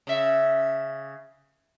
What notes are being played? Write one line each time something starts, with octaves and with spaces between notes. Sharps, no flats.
C#3 E5